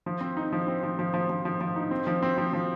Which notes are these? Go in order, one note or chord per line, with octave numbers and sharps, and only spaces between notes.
F3
C4
D#4
F3
C4
F3
F3
F3
F3
F3
F3
D#4
C4
F3
C4
F3
F3